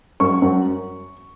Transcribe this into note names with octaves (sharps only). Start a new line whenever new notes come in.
F#2 C#6
F#2